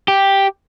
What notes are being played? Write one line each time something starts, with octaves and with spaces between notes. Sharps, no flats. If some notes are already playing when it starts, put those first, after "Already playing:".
G4